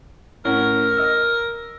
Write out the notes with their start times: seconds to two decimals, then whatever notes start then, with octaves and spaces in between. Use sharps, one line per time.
0.45 A2 C#4 A#4 F#5
0.97 D#5 E6